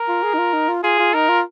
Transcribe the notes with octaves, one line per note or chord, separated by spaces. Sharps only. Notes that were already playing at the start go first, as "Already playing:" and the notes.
Already playing: A#4
F4
G#4
D#4
F4
D#4
F4
F4 G#4
F4
D#4 A#4
F4